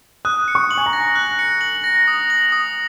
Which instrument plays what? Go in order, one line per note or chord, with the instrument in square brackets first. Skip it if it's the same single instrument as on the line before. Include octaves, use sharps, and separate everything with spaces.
[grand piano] D#6 [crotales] F#6
[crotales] C#7
[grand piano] C#6
[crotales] F#7
[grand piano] G#5
A#5
[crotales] A#6
F#6
C#7
F#7
A#6
D#6
F#7
D#6